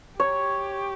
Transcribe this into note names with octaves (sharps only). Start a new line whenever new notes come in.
G4 C#5